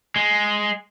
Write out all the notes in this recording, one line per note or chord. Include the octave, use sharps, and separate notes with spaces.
G#3